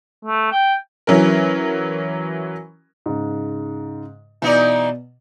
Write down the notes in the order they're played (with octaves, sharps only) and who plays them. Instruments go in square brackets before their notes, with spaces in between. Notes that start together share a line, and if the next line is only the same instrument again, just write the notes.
[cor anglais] A3
G5
[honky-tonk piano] E3 F#3 C#4 A#4
[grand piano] G#2 C#3
[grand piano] B2 A#5 [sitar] E3 D#4 D5